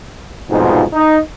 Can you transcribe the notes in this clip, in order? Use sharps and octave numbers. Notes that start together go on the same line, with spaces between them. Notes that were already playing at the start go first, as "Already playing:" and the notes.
C2 F2 G#2 B2 F3 D#4
D#4